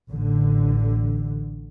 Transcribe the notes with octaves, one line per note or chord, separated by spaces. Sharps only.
A1 D3